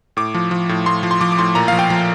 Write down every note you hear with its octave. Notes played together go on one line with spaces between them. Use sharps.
A2 D6
F3
F3
A2
A2 C6
F3
C6
F3 D6
D6
A2 C6
A#2 A#5
F3 F5
G5
F3